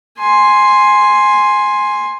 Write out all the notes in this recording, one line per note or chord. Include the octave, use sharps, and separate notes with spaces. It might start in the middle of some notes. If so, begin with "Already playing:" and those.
G#5 C6